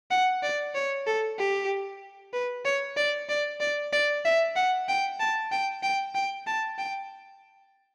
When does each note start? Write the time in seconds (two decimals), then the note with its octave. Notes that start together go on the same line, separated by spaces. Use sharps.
0.11 F#5
0.43 D5
0.75 C#5
1.07 A4
1.39 G4
2.33 B4
2.65 C#5
2.97 D5
3.29 D5
3.61 D5
3.93 D5
4.25 E5
4.56 F#5
4.88 G5
5.20 A5
5.52 G5
5.83 G5
6.15 G5
6.47 A5
6.79 G5